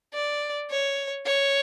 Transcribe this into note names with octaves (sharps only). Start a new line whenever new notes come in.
D5
C#5
C#5